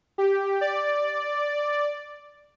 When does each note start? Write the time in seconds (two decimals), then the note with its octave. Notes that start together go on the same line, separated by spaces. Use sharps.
0.18 G4
0.61 D5